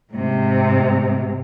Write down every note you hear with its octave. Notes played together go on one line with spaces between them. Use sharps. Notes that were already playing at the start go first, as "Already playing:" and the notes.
G#2 C3